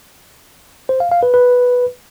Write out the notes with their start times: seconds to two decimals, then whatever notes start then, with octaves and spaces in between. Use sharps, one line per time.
0.89 C5
1.00 F5
1.11 F5
1.23 B4
1.34 B4